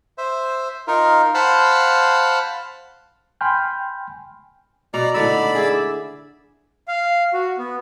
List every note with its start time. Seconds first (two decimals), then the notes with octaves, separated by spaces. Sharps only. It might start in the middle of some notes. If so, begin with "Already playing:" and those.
0.18 C5 E5
0.87 D#4 F4 A#4
1.34 C5 F5 F#5 A5 B5
3.41 G5 G#5 B5 C6 F6 G6
4.94 B2 D5 A#5
5.14 A2 D3 D#4 D5 B5 E6
5.55 G#4 E5
6.88 F5
7.33 F#4
7.58 B3